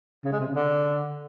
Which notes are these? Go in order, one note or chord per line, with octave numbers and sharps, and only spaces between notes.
C#3
G#3
C3
C#3
D3